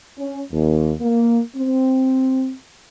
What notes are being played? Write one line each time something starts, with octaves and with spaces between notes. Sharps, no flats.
C#4
D#2
A#3
C4